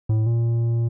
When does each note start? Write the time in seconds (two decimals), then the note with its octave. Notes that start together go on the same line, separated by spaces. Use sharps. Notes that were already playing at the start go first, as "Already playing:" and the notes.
0.09 A2
0.26 A#2